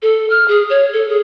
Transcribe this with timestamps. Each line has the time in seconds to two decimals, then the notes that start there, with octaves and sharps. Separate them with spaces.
0.02 A4
0.30 F6
0.48 G#4
0.70 C#5
0.93 A4
1.09 G#4